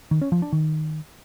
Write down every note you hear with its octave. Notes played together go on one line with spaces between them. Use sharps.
D#3
C#4
F3
D4
D#3